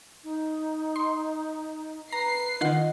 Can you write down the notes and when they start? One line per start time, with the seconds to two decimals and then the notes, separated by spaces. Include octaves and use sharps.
0.24 D#4
0.96 C6
2.12 B4 A#5 C7
2.61 D#3 F4 D#5 F#5